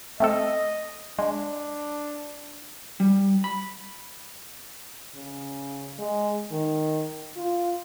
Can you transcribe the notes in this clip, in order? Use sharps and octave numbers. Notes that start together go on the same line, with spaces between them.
A3 C4 A4 D#5
G#3 D4
G3
B5
C#3
G#3
D#3
F4